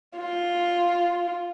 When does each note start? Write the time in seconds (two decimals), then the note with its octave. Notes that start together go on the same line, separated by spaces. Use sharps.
0.18 F4